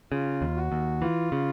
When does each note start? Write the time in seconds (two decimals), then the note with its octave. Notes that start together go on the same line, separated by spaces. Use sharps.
0.12 C#3 F4
0.42 D#2
0.56 F#4
0.72 D#2
1.02 E3 F4
1.32 C#3